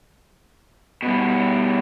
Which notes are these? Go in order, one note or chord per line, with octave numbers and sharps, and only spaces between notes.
B2 G3